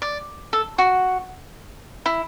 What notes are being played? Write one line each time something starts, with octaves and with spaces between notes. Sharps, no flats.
D5
A4
F#4
E4